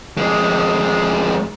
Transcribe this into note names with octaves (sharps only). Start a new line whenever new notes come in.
F2 G#3